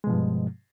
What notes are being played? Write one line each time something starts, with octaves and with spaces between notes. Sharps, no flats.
G2 B2 F3 G#3